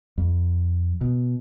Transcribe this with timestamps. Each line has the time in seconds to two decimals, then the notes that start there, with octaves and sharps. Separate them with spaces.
0.18 F2
1.01 B2